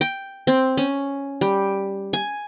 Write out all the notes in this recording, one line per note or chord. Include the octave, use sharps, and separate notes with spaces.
G5
C4
C#4
G3
G#5